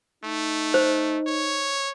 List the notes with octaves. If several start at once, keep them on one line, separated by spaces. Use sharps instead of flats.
A3 D#4
C5
C#5